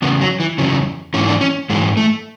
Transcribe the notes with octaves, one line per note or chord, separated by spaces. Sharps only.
E2 C#3 B3
F#3
E3
E2 C#3 F#3
G#2 E3 C#4
D4
C#4
G#2 E3 G#3
A3